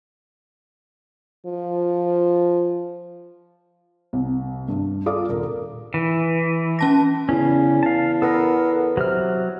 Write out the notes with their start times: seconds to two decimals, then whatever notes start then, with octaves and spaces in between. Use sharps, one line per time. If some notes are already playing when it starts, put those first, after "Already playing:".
1.46 F3
4.13 C2
4.68 G2
5.06 F4 A4 D5 F5 D6 D#6
5.29 D#1 A#4
5.94 E3
6.79 C#4 A5 A#6
7.29 E2 C#3 C#4
7.83 F5 A5
8.22 B3 A4 A#4
8.97 C3 F#3 F6